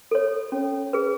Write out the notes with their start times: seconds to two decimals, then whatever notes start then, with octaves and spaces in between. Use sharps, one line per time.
0.11 A4 C#5
0.52 C#4
0.93 G#4 B4